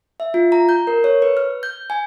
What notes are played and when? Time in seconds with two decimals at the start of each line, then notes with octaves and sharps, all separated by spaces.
0.20 E5
0.34 F4
0.52 A#5
0.69 G6
0.87 A#4
1.04 C#5
1.22 B4
1.37 F6
1.63 G6
1.90 G#5